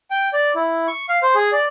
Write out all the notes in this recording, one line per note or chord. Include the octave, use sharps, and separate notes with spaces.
G5
D5
E4
C#6
F5
C5
G#4
D5